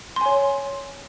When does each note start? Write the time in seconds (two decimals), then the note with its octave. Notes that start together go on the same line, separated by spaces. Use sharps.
0.16 C6
0.21 G#5
0.26 C#5